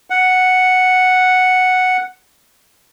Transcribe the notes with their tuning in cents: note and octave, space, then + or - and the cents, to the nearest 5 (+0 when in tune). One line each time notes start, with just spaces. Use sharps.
F#5 +0